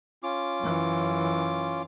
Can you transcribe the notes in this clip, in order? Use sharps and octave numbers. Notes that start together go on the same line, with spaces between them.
C#4 F4 D6
F#2 E3